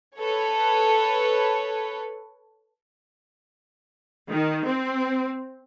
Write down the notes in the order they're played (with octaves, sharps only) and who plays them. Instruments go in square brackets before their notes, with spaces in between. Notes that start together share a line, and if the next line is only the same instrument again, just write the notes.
[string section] A4 B4 C#5
[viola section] D#3
C4